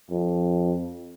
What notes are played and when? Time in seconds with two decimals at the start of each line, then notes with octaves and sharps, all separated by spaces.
0.11 F2